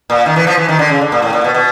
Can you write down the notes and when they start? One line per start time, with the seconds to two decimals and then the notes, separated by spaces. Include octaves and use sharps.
0.10 A#2
0.26 D#3
0.36 E3
0.47 F3
0.58 E3
0.69 D#3
0.79 D3
0.89 C#3
1.01 D3
1.12 A#2
1.22 A2
1.33 A#2
1.44 B2
1.54 B2